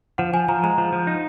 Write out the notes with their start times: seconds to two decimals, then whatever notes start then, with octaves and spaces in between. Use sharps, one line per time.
0.18 F3 F#5
0.33 F3 G#5
0.48 F3 A#5
0.63 G#3 A#5
0.78 F3
0.93 F3
1.07 D#4